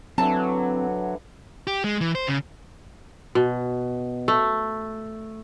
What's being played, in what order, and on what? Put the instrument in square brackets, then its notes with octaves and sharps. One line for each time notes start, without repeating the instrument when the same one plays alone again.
[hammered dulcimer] D3 E3 A4 [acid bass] F#3 [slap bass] C4 [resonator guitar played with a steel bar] A5
[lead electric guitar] G4
G#3
E3
C5
C#3
[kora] B2
A3